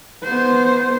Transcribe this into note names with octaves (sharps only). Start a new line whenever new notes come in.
B3 C5